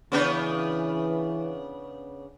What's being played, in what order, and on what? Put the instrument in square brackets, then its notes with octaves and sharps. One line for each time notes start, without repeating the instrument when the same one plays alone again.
[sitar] C#3 B3 D4 [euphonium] E3